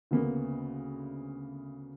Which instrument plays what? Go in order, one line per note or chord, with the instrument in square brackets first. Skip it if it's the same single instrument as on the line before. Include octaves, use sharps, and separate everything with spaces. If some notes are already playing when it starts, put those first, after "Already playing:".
[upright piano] D2 C#3 A#3 B3